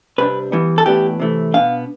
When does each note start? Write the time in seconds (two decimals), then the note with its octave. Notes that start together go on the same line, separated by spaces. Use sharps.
0.18 C3 G3 D4 B4
0.52 E3 G3 B3
0.78 A4
0.86 A2 E3 B3 D4 G4
1.20 C3 E3 A3
1.54 B2 B3 D4 F5